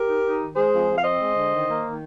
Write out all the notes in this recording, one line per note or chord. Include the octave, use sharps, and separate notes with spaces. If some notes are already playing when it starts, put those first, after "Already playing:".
Already playing: G4 A#4
D#4
D#4
D#3
G#3 G#4 C5
F2
F2
F5
C4 C5 D#5
G#3
D3
D#3
A#3
D#3